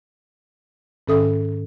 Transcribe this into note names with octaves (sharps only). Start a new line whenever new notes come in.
G#2 D#3 C#4 A4 E5 D#6